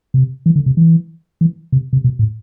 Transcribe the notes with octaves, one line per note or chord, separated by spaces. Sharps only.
C3
E3
D3
C3
E3
E3
C3
C3
B2
A2